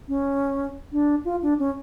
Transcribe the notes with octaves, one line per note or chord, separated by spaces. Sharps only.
C#4
D4
F4
D4
C#4